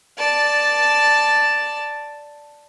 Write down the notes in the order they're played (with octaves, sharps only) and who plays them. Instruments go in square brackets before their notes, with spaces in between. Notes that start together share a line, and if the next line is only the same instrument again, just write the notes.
[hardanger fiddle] D5 A5